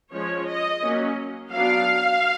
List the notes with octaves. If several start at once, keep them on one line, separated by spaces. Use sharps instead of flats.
F3 G#3 C#4 C#5
D#5
F#3 A#3 C#4
F#3 B3 D4 F5